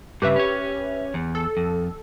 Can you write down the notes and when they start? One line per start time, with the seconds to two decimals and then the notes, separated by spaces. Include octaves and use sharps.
0.22 G2 C#3 G4 B4 E5
0.36 C#4 C#5
1.14 E2
1.35 A4
1.57 F2